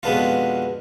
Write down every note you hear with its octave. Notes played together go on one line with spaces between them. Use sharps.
F2 B2 G#3 B3 D4 F4